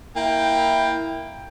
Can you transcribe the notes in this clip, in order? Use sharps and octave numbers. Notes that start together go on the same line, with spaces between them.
A#3 E4 G5